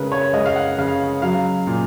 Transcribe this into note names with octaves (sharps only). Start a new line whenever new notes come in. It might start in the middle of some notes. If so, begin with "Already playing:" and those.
Already playing: C#3 G#3 A#4 B4
C#5
G#3 D#5
F5
F#5
C#3 F5
F#3 F5
A#2